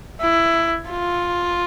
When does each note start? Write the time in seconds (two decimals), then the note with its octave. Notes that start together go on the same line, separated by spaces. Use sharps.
0.21 E4
0.90 F4